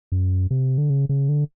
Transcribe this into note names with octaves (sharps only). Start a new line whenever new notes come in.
F#2
C3
D3
C#3
C#3
D3